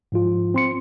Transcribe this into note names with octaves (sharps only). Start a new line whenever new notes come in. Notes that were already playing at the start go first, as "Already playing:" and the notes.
G#2 F3 F4
C4 C6 C#7